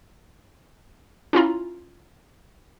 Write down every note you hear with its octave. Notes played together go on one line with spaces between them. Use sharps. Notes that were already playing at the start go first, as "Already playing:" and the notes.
C#4 E4 F4 A#5